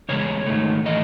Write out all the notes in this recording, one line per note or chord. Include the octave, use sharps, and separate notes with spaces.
E2 C#3 G#3 C#5
G#2 D#3 A3
A2 E3 A3 D#5